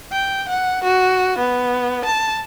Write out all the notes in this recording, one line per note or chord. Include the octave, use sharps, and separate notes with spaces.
G5
F#5
F#4
B3
A5